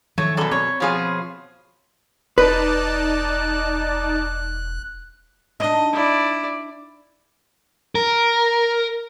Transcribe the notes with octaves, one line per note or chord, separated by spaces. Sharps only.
D#3 F3 F#3 A3 C#5
F#2 B2 A4 D5
C4 C#5
B2 F3 G#4 C#5 F5
E1 D#4 B4 D5 A5 F#6
D4 D#4 D#5
E4 D5
A#4